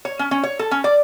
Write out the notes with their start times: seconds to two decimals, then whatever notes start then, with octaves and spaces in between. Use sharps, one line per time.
0.05 C#5
0.19 C#4
0.31 C#4
0.43 C#5
0.59 A4
0.71 C#4
0.84 D5